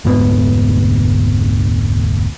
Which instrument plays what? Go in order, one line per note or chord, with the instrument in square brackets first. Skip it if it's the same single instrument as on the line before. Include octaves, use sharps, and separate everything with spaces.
[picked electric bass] F1 D2 G#2 B3